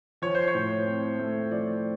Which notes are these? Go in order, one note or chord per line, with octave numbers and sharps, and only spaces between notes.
F3 C#5
C5
C#5
A2
C4
A3
F3 D5